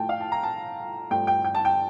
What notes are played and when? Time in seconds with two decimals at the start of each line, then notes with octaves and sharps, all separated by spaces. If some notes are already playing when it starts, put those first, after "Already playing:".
Already playing: A2 F3 A3 G5 A5
0.09 F5
0.20 A5
0.32 A#5
0.43 A5
1.11 G2 F3 A3 G5
1.27 G5
1.44 G5
1.55 A5
1.65 G5